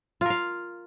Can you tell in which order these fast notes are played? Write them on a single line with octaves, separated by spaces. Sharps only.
F4 A#4 F5